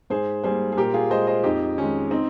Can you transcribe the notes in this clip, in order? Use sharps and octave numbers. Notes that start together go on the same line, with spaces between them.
G#2 G#4 C5
G3 A#3 G#4 C5
G#4
A#2 G4 A#4
F4 G#4
G#3 C5 D#5
C5 D#5
F2 D#4 G4
D#3 G#3 C#4
C4 D#4